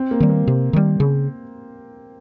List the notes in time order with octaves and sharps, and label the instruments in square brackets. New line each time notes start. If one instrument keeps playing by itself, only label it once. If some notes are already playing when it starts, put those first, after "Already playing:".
Already playing: [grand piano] C4
A#3
[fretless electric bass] D#3 G3
[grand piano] A#3
[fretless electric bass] C3
D#3 G3
C#3